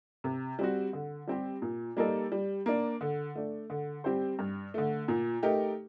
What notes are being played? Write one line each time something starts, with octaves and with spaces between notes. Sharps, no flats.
C3
G3 C4 F#4
D3
G3 C4 G4
A#2
G3 A#3 D#4 A4
G3
A#3 D4
D3
A3 D4
D3
G3 C4 G4 C5
G2
D3 A3
A#2
A3 D#4 G4 A#4